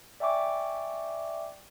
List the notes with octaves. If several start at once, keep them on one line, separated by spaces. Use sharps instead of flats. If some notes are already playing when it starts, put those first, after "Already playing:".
D5 E5 G5 G#5 C#6 D6